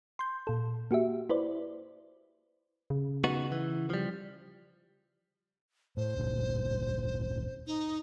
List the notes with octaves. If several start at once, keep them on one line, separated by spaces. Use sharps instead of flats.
C6 G6
A#2 A4
A#3 F#4 G4 E5
E4 B4 C5 D5
C#3
B3 D#4 F#4
E3
F3 G3
A2 C5
D1 G1 A#2
D#4